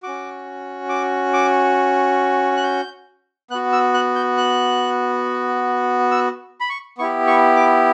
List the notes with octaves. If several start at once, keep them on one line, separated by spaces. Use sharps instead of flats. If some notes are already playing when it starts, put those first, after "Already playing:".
C#4 F#4 D6
D6
D6
F#6
G6
B3 F#4 F#6
E6
F#6
G6
F#6
E6
B5
C#6
B3 E4 G4 C#6
C#6
D6